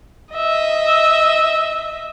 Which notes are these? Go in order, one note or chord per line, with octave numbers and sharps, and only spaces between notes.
D#5 E5